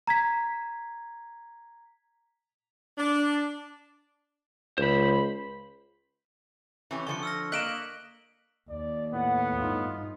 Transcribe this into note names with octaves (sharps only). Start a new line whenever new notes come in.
A#5 G#6 B6
D4
C#2 C5 B5
E3 C#4 G4
D3 F3 C#6 C#7
E6 F6 A#6
A#3 D#5 F#6 B6 D7 E7 F#7 G7
D#2 D5
A2 B3 F#5
G2 D#4 F4